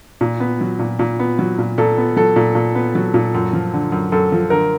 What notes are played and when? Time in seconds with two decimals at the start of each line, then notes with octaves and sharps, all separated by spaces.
0.21 A#2
0.40 B3
0.61 F#3
0.79 A#2
0.99 A#2
1.20 B3
1.39 F#3
1.58 A#2
1.78 A#2 A4
1.98 B3
2.17 F#3 A4
2.36 A#2
2.55 A#2
2.75 B3
2.95 F#3
3.14 A#2
3.34 F#2
3.53 F3
3.73 D3
3.92 F#2
4.12 F#2 A4
4.32 F3
4.50 D3 A#4